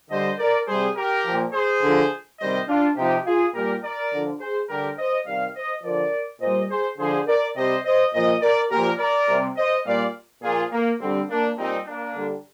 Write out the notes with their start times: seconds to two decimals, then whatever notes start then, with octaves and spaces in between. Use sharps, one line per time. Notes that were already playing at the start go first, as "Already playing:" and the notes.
0.10 D3 G3 C5 D#5
0.39 A#4 D5
0.68 C3 G3 G#4 C5
0.96 G4 A#4
1.25 F3
1.30 A#2
1.53 G#4 C5
1.82 D3 F3
2.40 C3 D#3 G3 C5 D#5
2.68 D4 F4
2.97 C3 F3 D#4 G4
3.26 F4 G#4
3.54 A#2 G3 G4 A#4
3.83 A#4 D5
4.13 D3 F3
4.40 G#4 C5
4.69 D3 G3 G4 A#4
4.98 C5 D#5
5.26 C3 D#3 G3 D5 F5
5.55 C5 D#5
5.84 D3 F3 A#4 D5
6.41 A#2 G3 C5 D#5
6.70 G#4 C5
6.98 D3 F3 G#4 C5
7.27 A#4 D5
7.56 C3 G3 C5 D#5
7.85 C5 D#5
8.14 A#2 F3 C5 D#5
8.42 A#4 D5
8.71 A#2 F3 G4 A#4
8.99 A#4 D5
9.29 C3 G3
9.57 C5 D#5
9.86 A#2 G3 D5 F5
10.43 A#2 F3 F4 G#4
10.72 A#3
11.00 D3 G3 C4
11.30 A#3 D4
11.58 A#2 G3 C4 D#4
11.87 A#3 D4
12.15 D3 G3